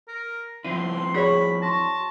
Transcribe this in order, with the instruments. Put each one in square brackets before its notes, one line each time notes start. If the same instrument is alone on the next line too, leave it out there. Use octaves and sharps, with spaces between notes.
[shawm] A#4
[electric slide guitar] F3 C4 E4 [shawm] C6 [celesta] D#7
[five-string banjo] F#4 C#5 [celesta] G#4 D5 C#6 [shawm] B5
[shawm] A5 [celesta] C6 C#6 A#6